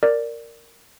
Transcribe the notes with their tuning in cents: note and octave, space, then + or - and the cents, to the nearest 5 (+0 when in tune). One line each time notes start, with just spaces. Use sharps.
A#4 -5 D5 +0